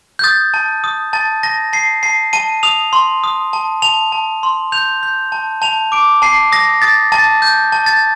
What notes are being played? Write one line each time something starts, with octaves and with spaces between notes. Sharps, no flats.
G6
D#6 A6
A5
D#6
A5 A6
A5 A#6
A5 C7
A5 C7
A5 D#7
D#6 F7
C6
D#6
A5
A5 F7
A5
C6
G6 F7
G6
A5
A5 F7
D6 D7
A5 C7
D#6 A#6
D#6 A6
A5 A6
G6
A5
A6